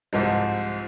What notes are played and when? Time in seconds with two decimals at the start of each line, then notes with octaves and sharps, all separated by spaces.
0.13 C2 G#2 F3 G#3